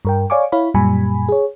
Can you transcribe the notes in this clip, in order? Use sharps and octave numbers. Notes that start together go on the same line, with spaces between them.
G2 A#4 G5
C#5 D5 F5 G#5 C#6 D6
E4 C#5 F5 B5
F#2 A#2 G3 G#5 B5
G#4 C#5